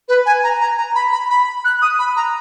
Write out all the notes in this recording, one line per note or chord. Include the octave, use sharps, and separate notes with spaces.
B4
G#5
A#5
A#5
A#5
B5
B5
B5
F#6
D#6
B5
A#5